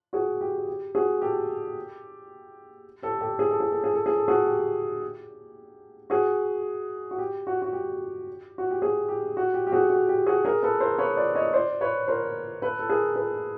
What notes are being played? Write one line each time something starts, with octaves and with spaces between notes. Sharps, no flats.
F#4 G#4
G4
G4
F#4 G#4
G4 A4
G4 A4
G4 A4
G#4
A4
G#4
A4
G#4
A4
G#4
A4
F#4 G#4
G4
F#4 G#4
F#4
G4
F#4
F#4
G4
F#4
G4
F#4 G#4
G4
F#4
G4
G4
F#4 G#4
F#4
G4
F#4 G#4
G#4 A#4
A4 B4
A#4 C5
B4 C#5
C5 D5
C#5 D#5
C5 D5
B4 C#5
A#4 C5
A4 B4
A4
G#4 A#4
A4 B4